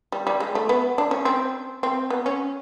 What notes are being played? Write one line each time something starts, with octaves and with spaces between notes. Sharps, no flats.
G3
G3
G#3
A3
B3
D4
C#4
C4
C4
B3
C#4